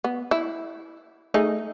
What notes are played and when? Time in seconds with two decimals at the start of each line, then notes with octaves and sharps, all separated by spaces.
0.04 B3
0.31 E4
1.34 A3 D#4 G#4